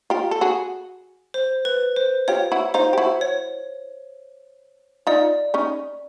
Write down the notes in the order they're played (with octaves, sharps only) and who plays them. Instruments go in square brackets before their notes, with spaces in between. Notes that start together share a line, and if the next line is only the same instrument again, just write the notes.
[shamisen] F4 G4
A4
F#4 G#4
[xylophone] C5
B4
C5
[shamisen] F4 G4 [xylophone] C#5
[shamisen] E4 F#4
[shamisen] D#4 F4 [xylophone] C5
[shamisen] G4
E4 F#4
[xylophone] C#5
[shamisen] D#4 F4 [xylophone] D5
[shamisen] C#4 D#4